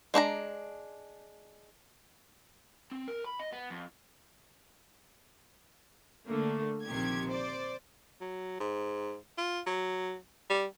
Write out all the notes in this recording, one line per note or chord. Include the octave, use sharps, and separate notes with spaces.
G#3 D4 B4 A#5
C4
A#4
B5
D#5
B3
F2
D3 A3 A#3
A#1 C3 D#3 F3 G4 G#6
C5 D5
F#3
G#2
F4
F#3
G3